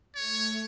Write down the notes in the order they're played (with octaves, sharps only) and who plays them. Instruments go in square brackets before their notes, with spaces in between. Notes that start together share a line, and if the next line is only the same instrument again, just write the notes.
[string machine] A3 [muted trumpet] C#5